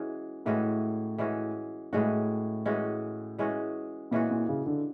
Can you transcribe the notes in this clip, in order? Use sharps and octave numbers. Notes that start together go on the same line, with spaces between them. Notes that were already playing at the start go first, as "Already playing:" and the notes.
Already playing: E3 G#3 C#4 F#4
A2 E3 G#3 C#4 F#4
E3 G#3 C#4 F#4
A2 E3 G#3 C#4 F#4
E3 G#3 C#4 F#4
E3 G#3 C#4 F#4
A#2 E3 G#3 C#4 F#4
A#2
C#3
D3